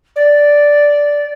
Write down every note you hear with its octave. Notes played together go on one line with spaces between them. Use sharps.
D5